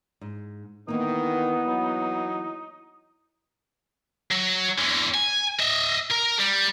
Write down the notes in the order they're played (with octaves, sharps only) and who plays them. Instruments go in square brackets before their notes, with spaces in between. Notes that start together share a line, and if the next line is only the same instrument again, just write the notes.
[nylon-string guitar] G#2
[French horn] D#3 [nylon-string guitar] E3 A#3 [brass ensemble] B3 [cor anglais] D#4
[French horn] F#3
[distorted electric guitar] F#3
E2 D3
G#5
D#5 E5
A#4
G3